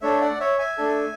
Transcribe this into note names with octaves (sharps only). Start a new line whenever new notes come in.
A3 D4 A4 C#5 E5
D5 F#5
C#5 E5
E5 G#5
A3 D4 A4